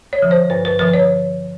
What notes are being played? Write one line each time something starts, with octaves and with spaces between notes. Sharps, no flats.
C#5
D3 F3
C5
G2 B4
B4
D3 F3 B4
C#5